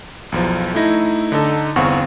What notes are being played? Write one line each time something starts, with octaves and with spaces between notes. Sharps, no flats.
B1 E2 F3
A3 D#4 E4 A#6
D3 D#4 A4
G1 E2 C4 F5 F#5 C#6